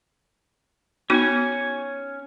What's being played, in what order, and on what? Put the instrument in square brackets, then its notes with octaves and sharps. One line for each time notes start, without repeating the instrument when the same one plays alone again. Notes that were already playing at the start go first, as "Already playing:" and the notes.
[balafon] B3 D#4 F#4 [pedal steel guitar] C#4 C#5 G#5